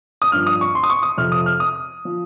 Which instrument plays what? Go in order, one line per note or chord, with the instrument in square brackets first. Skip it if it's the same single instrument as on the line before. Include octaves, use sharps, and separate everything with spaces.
[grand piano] D#6
G2 F3 F6
D#6
C#6
C6
D#6
C#6
D#6
F2 C3 F3 F6
D#6
F6
D#6
F3